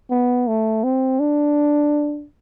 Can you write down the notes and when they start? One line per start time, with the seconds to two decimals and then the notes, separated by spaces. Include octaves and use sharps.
0.10 B3
0.47 A3
0.83 C4
1.20 D4